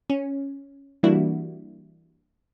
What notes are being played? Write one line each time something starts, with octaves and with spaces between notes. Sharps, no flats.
C#4
E3 G3 A#3 D4 E4 F#4